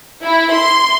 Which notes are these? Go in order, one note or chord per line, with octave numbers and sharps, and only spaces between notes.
E4
C6